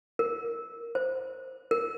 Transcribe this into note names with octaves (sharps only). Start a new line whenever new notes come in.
A#4
C5
A#4